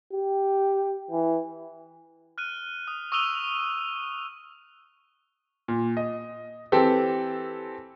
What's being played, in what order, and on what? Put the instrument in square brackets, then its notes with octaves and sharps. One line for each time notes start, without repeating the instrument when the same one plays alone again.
[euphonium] G4
E3
[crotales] F6 F#6 D#7
D#6
C#6 D#6 E6 D#7 F7 G7
[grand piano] A#2
D#5
E3 C4 G4 A4